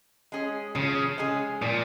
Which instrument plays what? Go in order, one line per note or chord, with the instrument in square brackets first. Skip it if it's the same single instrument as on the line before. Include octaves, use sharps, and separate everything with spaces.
[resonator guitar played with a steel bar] G#3 C#4 G#4
[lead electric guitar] C#3 [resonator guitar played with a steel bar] F3
[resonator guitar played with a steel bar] G#3 C#4 G#4
[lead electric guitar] A#2 [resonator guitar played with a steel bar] F3